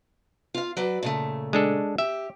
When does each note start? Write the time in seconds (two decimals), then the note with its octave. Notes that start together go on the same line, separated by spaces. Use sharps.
0.54 F4 F5
0.77 F#3 B4 D5
1.03 A#2 C#3 A3
1.53 G#3 D4 A4
1.98 G4 E5